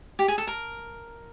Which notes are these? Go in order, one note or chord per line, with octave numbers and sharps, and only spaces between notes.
G4
G#4
A4
A#4